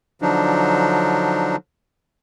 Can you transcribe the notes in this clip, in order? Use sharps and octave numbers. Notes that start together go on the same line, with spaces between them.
D3 F3 F#3 D4 D#4